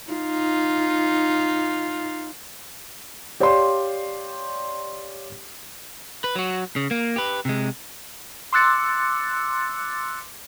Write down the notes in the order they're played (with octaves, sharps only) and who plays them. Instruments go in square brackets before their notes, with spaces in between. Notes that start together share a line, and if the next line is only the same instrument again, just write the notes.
[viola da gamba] D#4 F4
[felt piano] G4 C#5 D5 F5 C6
[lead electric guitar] B4
F#3 F#4
C#3
A#3
G4 B4
C3 G#3
[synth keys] C6 D6 E6 F#6 A6 C#7